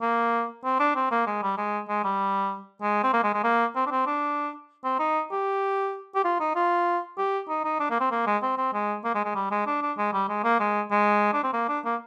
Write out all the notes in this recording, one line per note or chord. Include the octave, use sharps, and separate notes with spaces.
A#3
C4
D4
C4
A#3
G#3
G3
G#3
G#3
G3
G#3
C4
A#3
G#3
G#3
A#3
C4
D4
C4
D4
C4
D#4
G4
G4
F4
D#4
F4
G4
D#4
D#4
D4
A#3
C4
A#3
G#3
C4
C4
G#3
A#3
G#3
G#3
G3
G#3
D4
D4
G#3
G3
G#3
A#3
G#3
G#3
D4
C4
A#3
D4
A#3